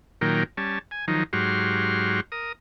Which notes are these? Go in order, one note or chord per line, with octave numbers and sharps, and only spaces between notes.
A#2 D#3 F#3 A#4 G5
G3 C#4 A5
G#5
D#3 F3 F#3 D#4
G#2 F#3 F#4 G4 C6 F6
A#4 D#6